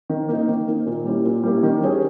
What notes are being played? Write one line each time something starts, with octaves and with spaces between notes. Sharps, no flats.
D#3
A#3 D#4
D#3
A#3 D#4
A#2
G3 A#3 C#4 E4
A#2
G3 A#3 C#4 E4
D#3
G3 C#4 G#4 C#5